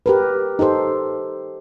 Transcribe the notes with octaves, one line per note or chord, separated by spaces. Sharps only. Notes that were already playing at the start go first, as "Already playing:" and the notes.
G4 A#4 B4
D#4 G4 A4 C5